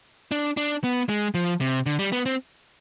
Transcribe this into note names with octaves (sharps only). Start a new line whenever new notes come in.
D4
D4
B3
G#3
F3
C3
D3
G3
B3
C4